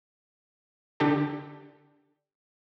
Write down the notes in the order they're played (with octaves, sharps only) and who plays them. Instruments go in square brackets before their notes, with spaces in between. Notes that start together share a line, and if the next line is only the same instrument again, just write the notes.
[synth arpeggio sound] D3 D4 G4 A4